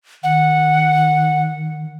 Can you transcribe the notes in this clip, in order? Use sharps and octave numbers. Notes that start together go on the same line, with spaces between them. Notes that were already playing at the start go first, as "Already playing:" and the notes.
D#3 F#5